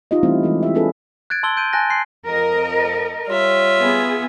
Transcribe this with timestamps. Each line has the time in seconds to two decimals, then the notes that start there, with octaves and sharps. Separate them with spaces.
0.11 D#4 F4 G4 D#5
0.23 E3 G3 A3 C4 C#4 E4
0.43 E3 G#3 G4 A4
0.63 E4 E5
0.74 C4 D4 F4 G#4 A4 B4
1.30 F#6 G#6 A6 D7
1.43 A5 C6 E6 G7
1.57 C6 G6 D7 D#7
1.73 G#5 A5 F#6 A6 A#6
1.90 C6 F#6 C7
2.26 F2 A#4 D#5
3.28 G3 F4 C#5 E5
3.78 B3 G#4